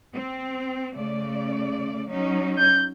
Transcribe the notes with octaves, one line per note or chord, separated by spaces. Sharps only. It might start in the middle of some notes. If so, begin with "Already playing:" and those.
C4
C#3 A3 D5
F#3 C#4 D#4
G6